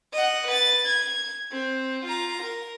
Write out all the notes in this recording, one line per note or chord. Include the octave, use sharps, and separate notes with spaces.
D#5 F#5
B4 A6
G#6
C4
F4 A#5
A#4